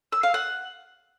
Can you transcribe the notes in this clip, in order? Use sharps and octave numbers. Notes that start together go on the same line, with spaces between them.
E6
F5
F#5